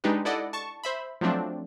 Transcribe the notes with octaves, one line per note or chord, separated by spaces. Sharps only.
G#3 D4 D#4 G4 B4
E4 A4 D5 D#5 F#5
A5 C#6
C5 E5 B5
F3 F#3 A3 C4 D4